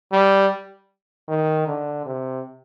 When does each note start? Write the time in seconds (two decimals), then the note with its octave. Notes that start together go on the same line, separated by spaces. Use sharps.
0.12 G3
1.28 D#3
1.67 D3
2.06 C3